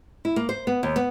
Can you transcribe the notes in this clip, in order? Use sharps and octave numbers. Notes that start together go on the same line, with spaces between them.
E4
A#3
C5
B3
D#2
B3